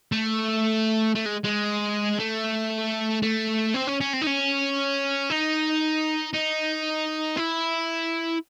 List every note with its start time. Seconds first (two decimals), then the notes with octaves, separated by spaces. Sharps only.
0.12 A3
1.15 A3
1.26 G#3
1.44 G#3
2.19 A3
3.22 A3
3.74 C4
3.87 C#4
4.01 C#4
4.13 C4
4.22 D#4
4.27 C#4
5.30 D#4
6.34 D#4
7.37 E4